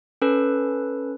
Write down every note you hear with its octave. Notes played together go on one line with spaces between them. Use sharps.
C#4 A4 B4